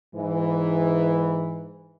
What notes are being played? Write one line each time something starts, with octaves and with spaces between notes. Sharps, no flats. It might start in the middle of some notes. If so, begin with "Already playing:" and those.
G#2 E3